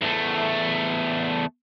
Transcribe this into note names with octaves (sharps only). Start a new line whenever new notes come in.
E2 A3